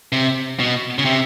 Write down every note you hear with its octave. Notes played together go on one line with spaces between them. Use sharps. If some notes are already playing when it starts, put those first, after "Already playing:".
C3
B2
C#3
C3